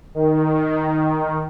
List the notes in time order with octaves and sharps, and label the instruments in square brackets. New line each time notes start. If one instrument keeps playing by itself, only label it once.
[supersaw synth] D#3